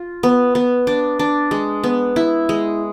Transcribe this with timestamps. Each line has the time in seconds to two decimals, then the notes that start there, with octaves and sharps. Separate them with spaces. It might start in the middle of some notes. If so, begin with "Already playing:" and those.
Already playing: F4
0.23 B3
0.55 B3
0.87 D4
1.19 D4
1.51 G#3
1.84 B3
2.16 E4
2.49 G#3